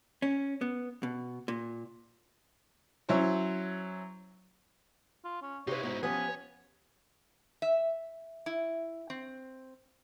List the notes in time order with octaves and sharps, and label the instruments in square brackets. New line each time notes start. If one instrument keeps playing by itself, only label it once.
[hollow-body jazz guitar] C#4
B3
B2
A#2
[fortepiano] F#3 C#4 E4 C5 C#5
[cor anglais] F4
C#4
[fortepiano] C3 [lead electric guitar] D#4 E4 [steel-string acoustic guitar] B4 F5 [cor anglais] C#5
[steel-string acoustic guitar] G#2 B3 [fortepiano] B2
[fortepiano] F3 G4 D#6 [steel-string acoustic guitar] B3 C#4 [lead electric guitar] C#5 [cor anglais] G#5
[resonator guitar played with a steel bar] E5
E4
C4